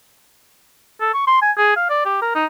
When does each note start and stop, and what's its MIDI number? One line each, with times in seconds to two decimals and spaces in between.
1.01 1.09 69
1.14 1.27 85
1.27 1.39 84
1.42 1.52 80
1.58 1.75 68
1.76 1.89 77
1.90 2.05 74
2.05 2.18 67
2.22 2.30 70
2.35 2.46 63